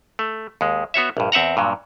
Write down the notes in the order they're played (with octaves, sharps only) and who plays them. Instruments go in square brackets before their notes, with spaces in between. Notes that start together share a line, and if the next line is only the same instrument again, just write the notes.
[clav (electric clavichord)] A3
D#2 G#3
B3 F#4 C#5 E5
A#1 G2
E2 C4 E5 F#5 A#5
G2 A#2 F#3